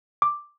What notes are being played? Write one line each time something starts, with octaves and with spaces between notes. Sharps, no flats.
D6